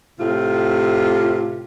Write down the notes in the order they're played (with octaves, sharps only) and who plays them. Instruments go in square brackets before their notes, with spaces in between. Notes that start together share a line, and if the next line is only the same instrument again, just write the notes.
[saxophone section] A2 C3 F4